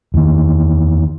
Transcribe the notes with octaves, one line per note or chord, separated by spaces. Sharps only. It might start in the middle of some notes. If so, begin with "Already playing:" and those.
E2 D#3